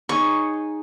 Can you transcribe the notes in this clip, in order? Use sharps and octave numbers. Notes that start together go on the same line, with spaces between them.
D#4 G#4 C#5 C#6